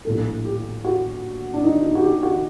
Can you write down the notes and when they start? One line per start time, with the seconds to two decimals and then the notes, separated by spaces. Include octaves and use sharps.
0.05 A#1 A2 G3 A4
0.45 G4
0.85 F#4
1.54 D4
1.64 D#4
1.83 D#4
1.95 F#4
2.02 G4
2.23 F#4